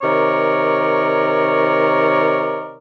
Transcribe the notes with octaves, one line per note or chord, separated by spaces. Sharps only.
C3 D#3 A#4 C#5 D5 C#6